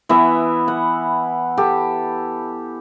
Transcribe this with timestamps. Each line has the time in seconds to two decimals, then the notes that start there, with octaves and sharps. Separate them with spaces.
0.09 E3 B3 E5
0.68 F#5
1.57 G4 A4